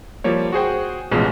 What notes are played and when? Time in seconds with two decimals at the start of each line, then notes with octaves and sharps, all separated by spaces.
0.24 F3 G3 A#3 C#5
0.52 F#4 G#4 C5 G5
1.11 A1 B2 F3 G#3